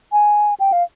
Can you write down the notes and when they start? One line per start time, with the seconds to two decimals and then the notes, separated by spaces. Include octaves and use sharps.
0.12 G#5
0.60 G5
0.72 F5